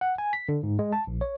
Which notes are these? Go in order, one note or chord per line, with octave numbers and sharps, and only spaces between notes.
F#5
G#5
B6
D3
G#2
G#3
A5
A#1
C#5